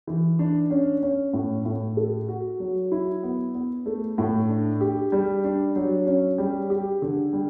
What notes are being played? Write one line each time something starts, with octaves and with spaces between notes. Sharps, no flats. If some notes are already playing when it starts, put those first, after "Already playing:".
E3
D4
C#4
C#4
A2
A2
A4
F#4
F#3
E4
B3
B3
A3
A2
D4
G4
G3
D4
F#3
C#4
G3
G4
D3
G3